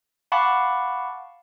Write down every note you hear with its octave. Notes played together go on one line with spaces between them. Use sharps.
F5 F#5 A5 B5 C#6 D6